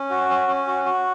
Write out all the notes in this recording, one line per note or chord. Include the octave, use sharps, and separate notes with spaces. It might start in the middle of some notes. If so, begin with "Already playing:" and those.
Already playing: C#4
F#4
C#4
C#4
F#4
F#4